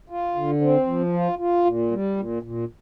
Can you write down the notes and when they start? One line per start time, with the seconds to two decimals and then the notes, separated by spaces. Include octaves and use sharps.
0.10 F4
0.35 D3
0.61 C4
0.87 F3
1.13 F4
1.39 F4
1.65 A#2
1.91 G3
2.17 A#2
2.43 A#2